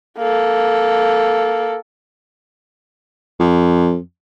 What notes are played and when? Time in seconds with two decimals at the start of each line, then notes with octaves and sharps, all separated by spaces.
0.17 A#3 A4
3.40 F2